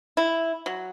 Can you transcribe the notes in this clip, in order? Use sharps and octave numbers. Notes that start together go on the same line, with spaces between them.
E4
F#3